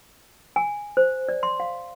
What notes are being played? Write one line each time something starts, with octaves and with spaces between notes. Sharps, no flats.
G#5
C5
D5
C6
F5